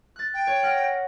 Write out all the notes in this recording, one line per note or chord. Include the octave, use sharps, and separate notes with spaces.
F#6 A6
G5
C#5
F#5 F6 A#6